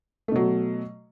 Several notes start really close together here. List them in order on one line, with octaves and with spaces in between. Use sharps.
A3 B2 F#3